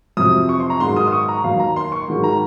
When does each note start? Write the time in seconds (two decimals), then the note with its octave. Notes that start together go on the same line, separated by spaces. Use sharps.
0.17 F2 C3 F#3 D#6
0.49 C#6
0.60 C6
0.70 A#5
0.80 G#2 D#3 F#3 C6
0.96 D#6
1.07 D#6
1.12 C#6
1.28 A#5
1.44 D#2 D#3 F#3 F5
1.59 A#5
1.76 C6
1.92 C#6
2.08 G#2 D#3 F#3
2.24 A#5